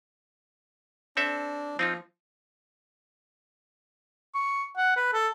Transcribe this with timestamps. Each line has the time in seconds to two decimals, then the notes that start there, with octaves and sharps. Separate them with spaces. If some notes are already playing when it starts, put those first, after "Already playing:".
1.17 C4 D4 A4 E5
1.79 F3 C4 D#4 F4
4.35 C#6
4.77 F#5
4.97 B4
5.14 A4